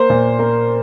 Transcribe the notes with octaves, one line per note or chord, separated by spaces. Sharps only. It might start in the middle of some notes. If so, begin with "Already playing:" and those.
Already playing: A#3 C5
A#2
A#3